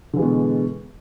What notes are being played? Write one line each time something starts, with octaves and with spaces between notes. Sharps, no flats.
B2 D3 E3 G#3